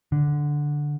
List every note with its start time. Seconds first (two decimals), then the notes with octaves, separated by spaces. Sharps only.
0.12 D3